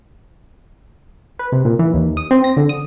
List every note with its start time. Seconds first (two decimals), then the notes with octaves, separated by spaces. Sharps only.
1.39 B4
1.52 C3
1.65 A#2
1.79 E3
1.94 D#2
2.17 D#6
2.31 C4
2.44 A#6
2.57 D3
2.69 D#6